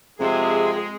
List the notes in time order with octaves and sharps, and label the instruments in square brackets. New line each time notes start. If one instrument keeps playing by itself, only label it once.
[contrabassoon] F2 [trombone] C3 [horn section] G#3 [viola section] G#4